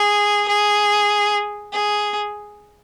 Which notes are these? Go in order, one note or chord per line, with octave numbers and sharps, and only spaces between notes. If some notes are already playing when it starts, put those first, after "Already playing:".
Already playing: G#4
G#4
G#4